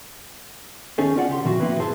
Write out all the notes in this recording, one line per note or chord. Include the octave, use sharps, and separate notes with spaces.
D#2 C#4 D#4 G#4 A4
C4 C#4 F4 D5 E5 F#5
C#2 G4 C6
A#2 E3 F3 C4 F#4
E3 A#3 C4 D#4 E4 B4
G2 E4 G#4 C5 A5 C6